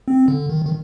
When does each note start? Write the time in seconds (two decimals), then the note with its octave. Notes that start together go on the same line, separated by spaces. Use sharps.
0.08 C4
0.28 D3
0.50 D#3
0.66 D#3